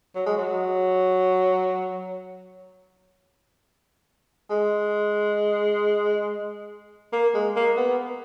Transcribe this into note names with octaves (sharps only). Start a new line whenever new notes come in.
F#3
G#3
F#3
G#3
A#3
G#3
A#3
B3